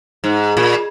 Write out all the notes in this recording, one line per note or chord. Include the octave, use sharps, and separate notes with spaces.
G#2
A#2